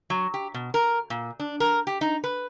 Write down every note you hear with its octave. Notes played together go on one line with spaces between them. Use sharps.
F#3
G4
B2
A#4
A#2
D4
A#4
G4
D#4
B4